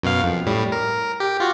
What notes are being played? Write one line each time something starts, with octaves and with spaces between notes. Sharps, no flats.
F#2 B2 F5
F2
A2 G3
A#4
G4
F4 F#4